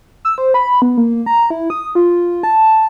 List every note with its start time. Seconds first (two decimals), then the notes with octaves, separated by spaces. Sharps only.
0.25 E6
0.38 C5
0.54 B5
0.82 B3
0.97 A#3
1.26 A#5
1.50 E4
1.70 D#6
1.95 F4
2.43 A5